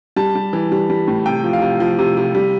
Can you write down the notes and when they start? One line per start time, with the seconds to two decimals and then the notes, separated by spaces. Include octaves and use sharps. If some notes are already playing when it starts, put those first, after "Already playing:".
0.16 G3 A5
0.35 G3
0.53 E3
0.72 G3
0.90 G3
1.08 A2
1.26 C3 G5
1.44 F3
1.53 F5
1.62 C3
1.80 F3
1.99 C3
2.17 C3
2.35 G3